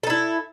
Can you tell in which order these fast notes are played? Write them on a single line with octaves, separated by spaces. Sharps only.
A4 D#4 E4